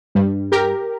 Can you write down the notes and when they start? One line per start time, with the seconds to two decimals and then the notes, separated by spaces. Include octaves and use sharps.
0.15 G2 G3
0.52 G4 A#4